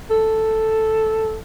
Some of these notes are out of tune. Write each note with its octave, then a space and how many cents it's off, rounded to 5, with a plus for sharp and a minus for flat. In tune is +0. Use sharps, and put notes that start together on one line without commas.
A4 +0